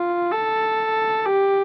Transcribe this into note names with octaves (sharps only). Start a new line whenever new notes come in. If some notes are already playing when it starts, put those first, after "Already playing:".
Already playing: F4
A4
G4